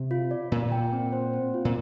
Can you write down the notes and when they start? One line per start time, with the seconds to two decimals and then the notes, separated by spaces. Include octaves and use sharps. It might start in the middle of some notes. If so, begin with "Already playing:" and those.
Already playing: C3
0.11 F4
0.31 D5
0.52 A#2 F4
0.72 G5
0.93 C4
1.13 C5
1.33 C4
1.54 F4
1.65 A#2